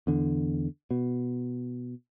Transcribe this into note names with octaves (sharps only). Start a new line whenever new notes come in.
E2 D3
B2